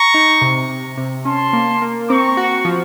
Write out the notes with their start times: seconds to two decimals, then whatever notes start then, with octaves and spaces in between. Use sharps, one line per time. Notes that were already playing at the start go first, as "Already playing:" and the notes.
Already playing: A#5 C#6
0.14 D#4
0.41 C3
0.69 C3
0.97 C3
1.25 C#4 A5 C6
1.53 A#3
1.82 A#3
2.09 C4 A#5 C#6
2.37 F#4
2.65 F3